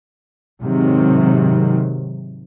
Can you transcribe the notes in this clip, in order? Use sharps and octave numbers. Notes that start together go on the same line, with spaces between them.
G#2 C3 D#3 F#3